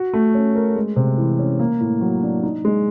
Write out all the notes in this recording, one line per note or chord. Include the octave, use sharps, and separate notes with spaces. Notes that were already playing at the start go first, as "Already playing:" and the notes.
Already playing: F#4
A3
C#4
A#4
G#3
C3
E3
C#4
A#3
A2
F#3
D4
D#4
G#3